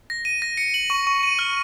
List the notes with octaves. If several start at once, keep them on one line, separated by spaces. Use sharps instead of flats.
A#6
D#7
A#6
C#7
F#7
C#6
C#6
D#7
F6